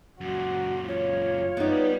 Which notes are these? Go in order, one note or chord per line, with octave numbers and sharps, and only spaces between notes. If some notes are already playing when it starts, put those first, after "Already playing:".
F#2 A#2 F#4
F4 C#5
G3 B3 D#4 D5